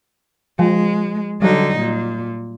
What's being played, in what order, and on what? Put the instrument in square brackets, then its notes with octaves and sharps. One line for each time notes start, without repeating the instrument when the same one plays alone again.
[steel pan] F3 [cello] G#3
[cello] D3 D#4 [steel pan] F#3 G3
[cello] A#2